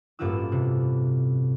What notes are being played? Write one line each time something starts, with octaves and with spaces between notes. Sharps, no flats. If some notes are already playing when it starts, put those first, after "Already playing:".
A1 G2 A#3 F4 F#4 E6
C3